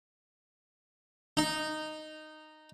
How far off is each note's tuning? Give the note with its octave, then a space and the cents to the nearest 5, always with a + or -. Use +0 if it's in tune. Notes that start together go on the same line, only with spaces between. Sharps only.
D#4 -10